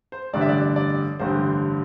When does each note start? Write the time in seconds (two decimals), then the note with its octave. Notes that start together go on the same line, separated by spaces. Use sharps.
0.12 C5
0.33 A1 G2 D3 D5
0.41 E5
0.49 D5
0.76 D5
1.19 A1 G2 D3 C5